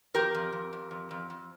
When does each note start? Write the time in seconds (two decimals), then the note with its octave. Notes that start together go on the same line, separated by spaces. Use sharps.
0.14 F2 G4 A#4
0.35 F2
0.52 F2
0.73 F2
0.91 F2
1.11 F2
1.30 F2